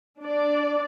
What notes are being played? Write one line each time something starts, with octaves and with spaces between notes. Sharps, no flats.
D4 D5